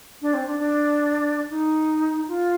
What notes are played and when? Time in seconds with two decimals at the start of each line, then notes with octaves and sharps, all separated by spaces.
0.22 D4
0.34 C4
0.47 D4
0.60 D4
1.50 D#4
2.28 F4